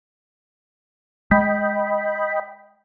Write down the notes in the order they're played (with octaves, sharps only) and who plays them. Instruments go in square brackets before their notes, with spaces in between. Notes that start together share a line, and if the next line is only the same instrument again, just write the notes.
[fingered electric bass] G#3 [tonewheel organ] D#5 G5 B5